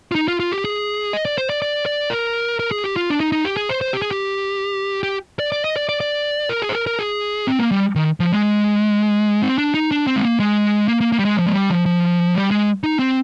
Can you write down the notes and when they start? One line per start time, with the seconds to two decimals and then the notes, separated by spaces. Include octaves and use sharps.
0.12 F4
0.15 D#4
0.28 F4
0.40 F4
0.52 G4
0.65 G#4
1.13 D#5
1.25 D5
1.38 C5
1.50 D5
1.62 D5
1.86 D5
2.10 A#4
2.59 A#4
2.71 G#4
2.84 G4
2.96 F4
3.10 D4
3.20 D#4
3.32 D#4
3.45 G4
3.57 G#4
3.69 C5
3.81 C5
3.93 G4
4.02 G#4
4.11 G4
5.03 G4
5.39 D5
5.52 D5
5.64 D#5
5.76 D5
5.89 D5
6.00 D5
6.49 A#4
6.62 G#4
6.69 C5
6.74 A#4
6.87 A#4
6.99 G#4
7.47 C4
7.59 A#3
7.71 G3
7.95 D#3
8.20 F3
8.32 G#3
9.42 C4
9.58 D4
9.74 D#4
9.91 D4
10.07 C4
10.16 G#3
10.24 A#3
10.40 G#3
10.88 A#3
11.01 A#3
11.12 A#3
11.19 G3
11.25 G#3
11.37 F3
11.46 G#3
11.53 G3
11.70 F3
11.86 F3
12.35 G3
12.51 G#3
12.84 D#4
12.99 C4